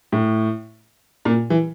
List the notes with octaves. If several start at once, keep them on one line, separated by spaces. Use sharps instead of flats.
A2
A#2
E3